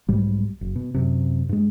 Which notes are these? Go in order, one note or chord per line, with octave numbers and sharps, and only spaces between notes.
B1 G#2 G3
F#1
B2
F#2 C3
G2 G#3